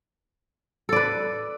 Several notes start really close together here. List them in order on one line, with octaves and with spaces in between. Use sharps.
A4 D5 B4